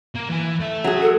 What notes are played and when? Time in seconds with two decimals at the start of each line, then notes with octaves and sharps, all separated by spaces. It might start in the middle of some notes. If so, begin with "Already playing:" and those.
0.16 A#3
0.29 E3 G#5
0.60 A3 E5
0.84 F#3 G#4
1.02 A4